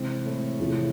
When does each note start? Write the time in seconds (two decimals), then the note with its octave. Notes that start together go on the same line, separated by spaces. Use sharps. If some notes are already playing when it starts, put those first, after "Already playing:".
Already playing: C3 E3 G#3 C4
0.26 A2
0.59 E2 C3 F3 A3 C4